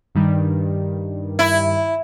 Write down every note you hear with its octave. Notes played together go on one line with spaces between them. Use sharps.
G2 D#3 G3
E4